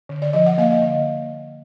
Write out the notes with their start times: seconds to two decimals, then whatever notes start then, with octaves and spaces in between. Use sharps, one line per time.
0.09 D3
0.22 D5
0.33 F3 D#5
0.46 F#5
0.58 A#3 F5
0.71 D#5
0.82 D3